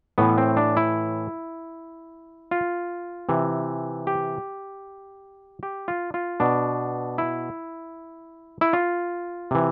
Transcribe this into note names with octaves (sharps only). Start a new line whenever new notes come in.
A2 E3 B3
C4
D4
E4
F4
C3 E3
G4
G4
F4
F4
B2 D4
E4
E4
F4
C3 E3